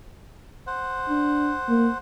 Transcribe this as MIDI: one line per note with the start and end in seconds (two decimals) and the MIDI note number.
0.67 1.98 72
0.67 1.98 78
1.09 1.53 62
1.69 1.89 58